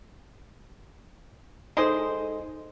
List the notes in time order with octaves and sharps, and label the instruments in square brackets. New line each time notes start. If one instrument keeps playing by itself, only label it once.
[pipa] G#3 G#4 C5 [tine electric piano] D#4 A4